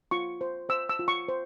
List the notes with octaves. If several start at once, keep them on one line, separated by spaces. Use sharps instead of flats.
F4 C#6
C5
C5 E6
E6
F4
C#6
C5